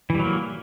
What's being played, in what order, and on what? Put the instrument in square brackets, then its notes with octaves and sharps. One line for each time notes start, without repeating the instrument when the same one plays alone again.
[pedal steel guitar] E3
G3
F#3
A#3